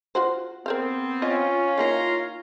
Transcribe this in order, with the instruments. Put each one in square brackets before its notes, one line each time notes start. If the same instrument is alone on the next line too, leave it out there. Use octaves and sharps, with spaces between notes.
[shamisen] F4 F#4 C5
[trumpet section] B3 C4 [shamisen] A#4 C5 F5
[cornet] C#4 [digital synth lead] F4 [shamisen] D#5
[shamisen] D#3 A#3 E4 [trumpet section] C#5 A#5 C6